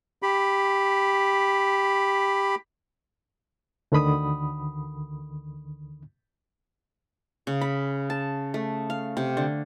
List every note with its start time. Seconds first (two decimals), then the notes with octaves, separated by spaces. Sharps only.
0.23 G4 B5
3.92 D2 D3 D#3 B5 D#6
7.47 C#3
7.61 B5
8.10 A5
8.54 A3
8.90 F5
9.17 C3
9.37 D3